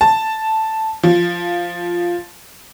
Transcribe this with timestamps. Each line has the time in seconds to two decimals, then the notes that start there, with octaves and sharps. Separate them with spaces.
0.01 A5
1.03 F3